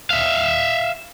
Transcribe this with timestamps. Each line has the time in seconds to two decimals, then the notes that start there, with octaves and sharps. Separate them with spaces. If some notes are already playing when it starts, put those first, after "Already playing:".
0.10 E5 F5